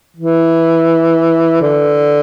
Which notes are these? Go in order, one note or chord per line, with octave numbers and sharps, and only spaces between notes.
E3
D3